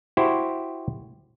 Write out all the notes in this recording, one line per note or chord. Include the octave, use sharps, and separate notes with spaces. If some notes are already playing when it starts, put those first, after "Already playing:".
E4 F#4 G4 C5